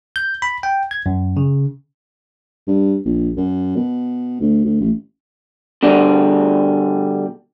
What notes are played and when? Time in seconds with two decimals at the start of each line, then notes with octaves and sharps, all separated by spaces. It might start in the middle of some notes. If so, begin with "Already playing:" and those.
0.16 G6
0.42 B5
0.63 G5
0.91 G#6
1.06 F#2
1.37 C#3
2.67 G2
3.05 A#1
3.37 F#2
3.76 B2
4.41 D2
4.65 D2
4.81 A1
5.83 B2 D3 G3